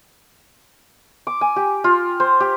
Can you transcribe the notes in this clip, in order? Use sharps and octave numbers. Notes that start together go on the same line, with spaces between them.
D6
G#5
G4
F4
C5
G4